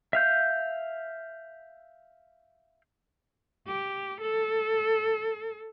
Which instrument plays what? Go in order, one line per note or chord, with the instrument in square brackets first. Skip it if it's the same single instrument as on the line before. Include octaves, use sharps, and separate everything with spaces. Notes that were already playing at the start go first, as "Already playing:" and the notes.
[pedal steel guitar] E5 F5 G6
[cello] G4
A4